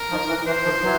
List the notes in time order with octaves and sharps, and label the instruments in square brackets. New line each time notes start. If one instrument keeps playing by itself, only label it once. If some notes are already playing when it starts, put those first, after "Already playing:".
Already playing: [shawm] A#4
[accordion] D#3 F3
E3
[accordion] E3 [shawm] C5
[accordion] D#3 F3
E3 F#3